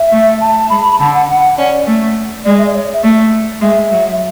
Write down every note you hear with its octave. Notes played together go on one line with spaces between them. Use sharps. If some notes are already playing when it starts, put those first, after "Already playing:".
Already playing: E5
A3
A5
G#3 B5
D3 A5
F#5
F#5
C#4 D5
A3
G#3 D5
E5
D5
C#5
E5
A3
G#3 E5
F#3